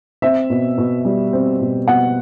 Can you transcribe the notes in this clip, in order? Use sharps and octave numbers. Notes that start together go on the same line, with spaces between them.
C4 E5
B2
B2
G3
C4
B2
B2 F#5